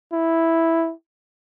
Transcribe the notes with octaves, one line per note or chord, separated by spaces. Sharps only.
E4